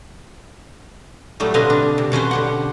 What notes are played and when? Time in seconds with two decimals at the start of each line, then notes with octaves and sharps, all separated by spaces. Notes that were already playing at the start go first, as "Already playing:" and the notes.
1.40 A2 F#3 G3 A3
1.54 B2 D3 C4 B4 D#5 F5
1.70 D4
1.98 C3
2.12 B2 C#4 B4 C5
2.31 D3 G4 F#5